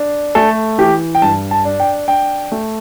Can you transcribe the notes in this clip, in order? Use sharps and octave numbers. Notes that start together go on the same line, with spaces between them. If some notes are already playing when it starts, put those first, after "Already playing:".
Already playing: D4
A3 A4
E3 G4
G5
G2 A5
A5
D4
G5
D4 G5
A3